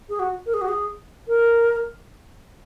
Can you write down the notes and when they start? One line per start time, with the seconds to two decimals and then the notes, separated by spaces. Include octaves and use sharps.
0.09 G#4
0.19 F#4
0.46 A#4
0.54 G#4
0.61 F#4
0.68 G#4
1.28 A#4